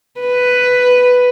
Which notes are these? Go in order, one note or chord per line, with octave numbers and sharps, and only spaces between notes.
B4